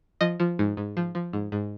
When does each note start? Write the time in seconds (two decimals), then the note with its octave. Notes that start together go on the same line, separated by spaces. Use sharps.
0.21 F3 D#5
0.40 F3
0.59 G#2
0.77 G#2
0.97 F3
1.15 F3
1.33 G#2
1.52 G#2